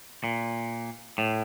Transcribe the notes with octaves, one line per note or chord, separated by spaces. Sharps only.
A#2
A2